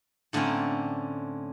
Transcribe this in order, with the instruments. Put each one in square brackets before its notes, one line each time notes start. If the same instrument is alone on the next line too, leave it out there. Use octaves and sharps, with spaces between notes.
[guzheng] A2 D3 A#3 C4 C#4